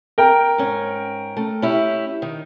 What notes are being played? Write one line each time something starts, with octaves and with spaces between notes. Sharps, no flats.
A#4 G5
G#2 C#4
A3
C#4 E4 G4
D#3 D#4